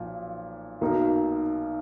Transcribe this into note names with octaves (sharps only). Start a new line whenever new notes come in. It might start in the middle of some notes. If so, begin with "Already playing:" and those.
Already playing: B1 A#2 F3
B1 B2 A#3 D#4